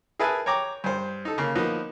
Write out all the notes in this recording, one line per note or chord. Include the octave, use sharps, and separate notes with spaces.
G#4 A#4 B4 E5 G#5 A5
C#5 G5 A#5 D6
G2 C5
D#4 A4
C#3 A#3
F3 A#3 B3 D#4